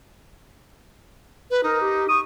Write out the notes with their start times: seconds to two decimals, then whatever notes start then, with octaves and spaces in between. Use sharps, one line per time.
1.51 B4
1.64 D#4 A#4
1.81 G4
2.09 C#6 D#6